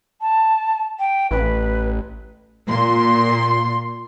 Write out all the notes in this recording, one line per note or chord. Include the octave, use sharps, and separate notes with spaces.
A5
G5
A1 B4
A#2 C6